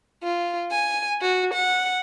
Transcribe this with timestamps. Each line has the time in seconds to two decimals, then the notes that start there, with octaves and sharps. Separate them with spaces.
0.23 F4
0.71 G#5
1.21 F#4
1.54 F#5